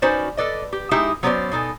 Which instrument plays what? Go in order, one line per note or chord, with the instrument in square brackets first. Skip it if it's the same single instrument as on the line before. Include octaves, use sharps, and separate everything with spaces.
[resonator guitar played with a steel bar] C#4 D#4 F#4 B4 C5 D5
A4 B4 D5 D#5
G4
G#3 D#4 E4 G4 G#4 E5
F#3 B3 C#4 A4 C5 D5
B2 D#4 A4 G#5